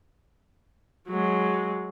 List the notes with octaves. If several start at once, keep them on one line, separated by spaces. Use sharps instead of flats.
F#3 G#3